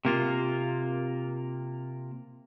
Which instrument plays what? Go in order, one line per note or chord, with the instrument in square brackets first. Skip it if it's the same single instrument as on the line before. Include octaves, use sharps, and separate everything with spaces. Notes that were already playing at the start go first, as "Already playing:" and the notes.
[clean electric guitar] C3 A#3 F4